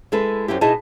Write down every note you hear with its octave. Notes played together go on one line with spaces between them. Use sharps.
G#3 E4 A4 B4
F#2 C4 E4 G4
B2 D#4 E4 G#4 D#5 A5